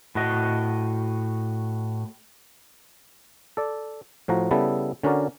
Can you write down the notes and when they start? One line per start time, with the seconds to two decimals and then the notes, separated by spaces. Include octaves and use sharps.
0.15 A2 F#4 D#5
3.57 A4 D5
4.28 A2 F3 F#4 A#5
4.51 C#3 G3 B3 E4 A4
5.03 D3 C#4 F#4 A#4 D5